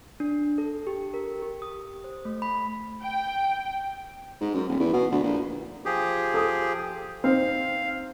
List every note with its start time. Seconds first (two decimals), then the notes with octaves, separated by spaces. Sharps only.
0.20 D4
0.58 A4
0.87 G4
1.14 A#4
1.42 G4
1.62 D#6
2.04 C5
2.25 A3
2.42 B5
3.04 G5
4.41 G#2
4.54 F#2
4.69 D#1
4.80 E2
4.93 B2
5.12 D2
5.24 A#1
5.85 F3 G4 G#4
6.34 A4 D#6
7.24 C4 D#4 F5